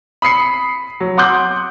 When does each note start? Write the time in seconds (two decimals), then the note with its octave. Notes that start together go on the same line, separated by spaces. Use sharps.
0.22 B5 D#6 C7 C#7
1.00 F#3
1.17 F#5 C6 D6 D#6 F#6 G6